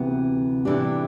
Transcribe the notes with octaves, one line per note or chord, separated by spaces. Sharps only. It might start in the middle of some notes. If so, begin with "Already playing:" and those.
Already playing: D2 C3 E3 B3
C3 E3 A3 D4 G4